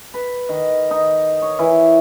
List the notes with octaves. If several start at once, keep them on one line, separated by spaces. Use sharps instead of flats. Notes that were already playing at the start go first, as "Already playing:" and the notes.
B4
D#3
D#4
C#5
E3